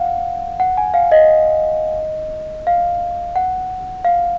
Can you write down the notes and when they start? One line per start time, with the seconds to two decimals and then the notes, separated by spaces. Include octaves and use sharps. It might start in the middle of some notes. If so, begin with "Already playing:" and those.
Already playing: F5 F#5
0.60 F#5
0.78 G#5
0.94 F5
1.12 D#5
2.67 F5
3.36 F#5
4.05 F5